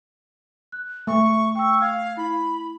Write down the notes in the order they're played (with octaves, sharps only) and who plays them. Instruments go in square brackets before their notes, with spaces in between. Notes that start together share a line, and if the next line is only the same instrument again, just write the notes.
[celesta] F#6
[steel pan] A3 [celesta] E5 [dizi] C#6
[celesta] G5 E6 [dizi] C#6
[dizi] F5 [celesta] F6 G#6
[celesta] E4 [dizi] B5